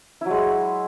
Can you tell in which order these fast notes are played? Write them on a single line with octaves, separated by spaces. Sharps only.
E4 F#3 G#3